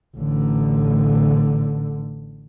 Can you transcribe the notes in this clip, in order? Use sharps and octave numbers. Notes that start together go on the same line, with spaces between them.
A1 D3